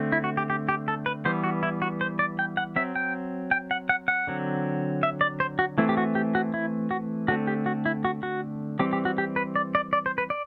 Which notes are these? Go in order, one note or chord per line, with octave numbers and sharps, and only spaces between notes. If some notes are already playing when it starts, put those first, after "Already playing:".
Already playing: D3 A3 C4
E4
F#4
G4
G4
G4
A4
B4
E3 G3 B3 C5
F#4
E4
F#4
C5
D5
G5
F#5
F#3 C4 E5
G5
G5
F#5
F#5
F#5
D3 F#3 C4
E5
D5
C5
F#4
E3 A3 C4 E4
G4
F#4
G4
F#4
E4
F#4
D3 A3 C4 F#4
G4
F#4
E4
F#4
F#4
E3 G3 C4 G4
G4
F#4
G4
B4
D5
D5
D5
C5
B4
D5